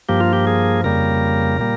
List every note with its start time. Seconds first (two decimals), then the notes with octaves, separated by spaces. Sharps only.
0.09 G2 F3 A#3 G4
0.20 F4
0.33 G4
0.47 G#4
0.84 F2 C#3 G3 A#3 A#4
1.60 A#2 G3 A#3